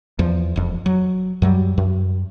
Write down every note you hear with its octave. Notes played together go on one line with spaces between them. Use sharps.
E2 F3
E1 F2
F#3
F#2 F#3 G3
F#2